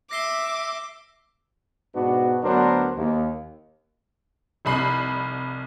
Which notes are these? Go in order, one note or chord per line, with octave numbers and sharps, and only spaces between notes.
E5 D6 A#6 C7 G7
G#2 B2 B3 D4 F#4
D2 F#3 B3 D4 A#4 C5
D#2
F1 C2 B5 C7